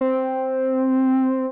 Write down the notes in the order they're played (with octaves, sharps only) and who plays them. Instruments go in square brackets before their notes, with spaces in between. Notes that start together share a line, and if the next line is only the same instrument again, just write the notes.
[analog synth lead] C4